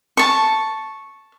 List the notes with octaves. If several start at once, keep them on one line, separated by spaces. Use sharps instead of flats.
A5 C#6